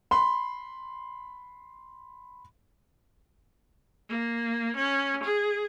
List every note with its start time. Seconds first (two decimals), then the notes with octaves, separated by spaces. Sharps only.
0.11 B5 C6
4.09 A#3
4.76 C#4
5.23 G#4